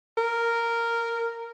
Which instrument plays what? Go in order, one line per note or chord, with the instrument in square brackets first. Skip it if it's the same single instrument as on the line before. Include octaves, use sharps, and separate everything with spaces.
[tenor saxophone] A#4